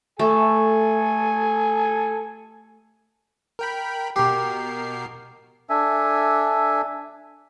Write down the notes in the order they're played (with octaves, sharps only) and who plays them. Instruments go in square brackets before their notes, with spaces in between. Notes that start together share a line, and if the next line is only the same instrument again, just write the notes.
[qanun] A3 [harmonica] A4 G#5
[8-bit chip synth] A#4 G5 B5
[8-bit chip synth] B2 A#4 C7 [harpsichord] G4
[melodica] D4 A4 E5 G#5